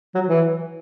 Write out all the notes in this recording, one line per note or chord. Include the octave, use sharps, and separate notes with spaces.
F#3
E3